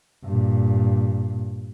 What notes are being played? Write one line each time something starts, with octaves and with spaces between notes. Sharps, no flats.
G2 A#2